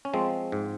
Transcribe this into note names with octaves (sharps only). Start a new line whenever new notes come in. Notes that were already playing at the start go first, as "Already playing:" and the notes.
C#4
F3 G#3 C4
G#2